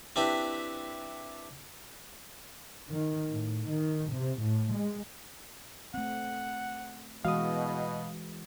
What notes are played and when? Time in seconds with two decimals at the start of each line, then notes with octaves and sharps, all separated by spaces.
0.16 C4 D4 E4 G4 B4 C5
2.92 D#3
3.30 A2
3.69 D#3
4.11 C3
4.41 A2
4.72 G#3
5.94 A3 C4 F#5
7.25 B2 E3 G#3 F#4 D#5 F5 D#6